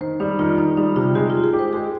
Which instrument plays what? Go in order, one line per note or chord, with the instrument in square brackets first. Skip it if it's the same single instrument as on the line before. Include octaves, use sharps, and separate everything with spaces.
[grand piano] D#3 [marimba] C5
[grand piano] G3 [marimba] D#4
[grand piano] D#3 [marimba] F4
[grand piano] D#3 [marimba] D#4
[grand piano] G3 [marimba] D#4
[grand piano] C3 [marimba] F4
[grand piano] G#3 [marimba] G4
[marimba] F4
[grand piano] G#3
[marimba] G#4
[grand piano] G4
[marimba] C5
[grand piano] G#3 [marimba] G#4